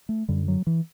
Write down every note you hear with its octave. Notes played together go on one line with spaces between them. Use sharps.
A3
F#2 D3 G3
F#3
E3